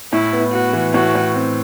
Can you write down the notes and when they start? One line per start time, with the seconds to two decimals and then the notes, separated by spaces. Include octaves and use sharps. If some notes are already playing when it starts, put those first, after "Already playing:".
0.13 A2 E4
0.32 B3
0.53 B3 F#4
0.73 E3
0.94 A2 F#4
1.15 A2
1.35 C4